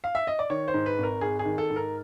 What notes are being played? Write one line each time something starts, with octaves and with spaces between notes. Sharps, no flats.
F5
E5
D#5
D5
D#3 C#5
C5
G#2
B4
G#1 A#4
G#1 G#4
G#4
D#3
A4
G#2
A#4